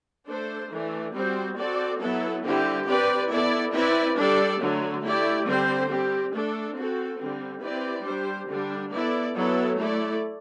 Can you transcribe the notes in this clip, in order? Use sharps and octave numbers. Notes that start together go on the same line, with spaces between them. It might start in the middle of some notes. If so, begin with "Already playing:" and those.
A3 D4 A4 C5
E3 A3 D4
G3 C4 F#4 C5
C4 F#4 A4 D5
F#3 B3 E4 A4
D3 G3 C4 E4 G4
C4 G4 B4 D5
B3 E4 A4 D5
C4 E4 B4 D5
G3 D4 A4 D5
D3 F#3 A3
A3 E4 G4 D5
D3 G3 C4 G4 C5
G3 C4 G4
A3 D4 A4
C4 F#4 A4
D3 G3 C4
C4 E4 G4 B4 D5
G3 D4 G4 C5
D3 G3 D4
B3 E4 A4 D5
F#3 B3 E4 A4
A3 E4 A4 D5